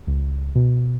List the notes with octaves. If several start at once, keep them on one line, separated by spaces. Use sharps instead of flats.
C#2
B2